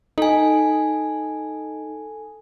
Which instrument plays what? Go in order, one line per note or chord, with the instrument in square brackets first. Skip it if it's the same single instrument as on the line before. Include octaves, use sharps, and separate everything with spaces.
[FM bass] D#4 [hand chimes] A4 G#5